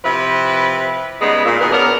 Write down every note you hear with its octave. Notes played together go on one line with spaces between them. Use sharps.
C3 F3 E4 B4
C#3 G3 G#3 B3 D#4
A#2
B2 D#3 B3 G#4
B3 C#4 D4 A#4